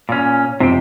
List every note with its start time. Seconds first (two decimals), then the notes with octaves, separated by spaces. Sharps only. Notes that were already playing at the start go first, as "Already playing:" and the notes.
0.09 A#2 C#4
0.60 F2 C3 G5